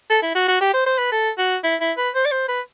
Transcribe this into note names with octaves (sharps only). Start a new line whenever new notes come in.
A4
E4
F#4
F#4
G4
C5
C5
B4
A4
F#4
E4
E4
B4
C5
D5
C5
B4